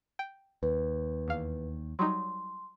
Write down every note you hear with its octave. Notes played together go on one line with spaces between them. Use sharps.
G5
D#2 B4
E2 F5
F#3 G3 D#4 C6